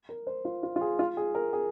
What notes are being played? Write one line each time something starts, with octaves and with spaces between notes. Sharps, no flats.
A#4
C5
F4
F4
F4
G#4
F4
G#4
A#4
G#4